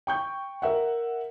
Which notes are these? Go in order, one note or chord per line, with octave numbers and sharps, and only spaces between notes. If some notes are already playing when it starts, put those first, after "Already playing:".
G5 C#6 G6
A#4 E5 F#5